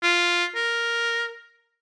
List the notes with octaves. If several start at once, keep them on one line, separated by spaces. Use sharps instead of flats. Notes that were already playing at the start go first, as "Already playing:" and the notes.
F4
A#4